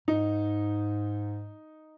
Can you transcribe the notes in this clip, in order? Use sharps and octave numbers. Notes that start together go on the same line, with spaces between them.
G#2 D#4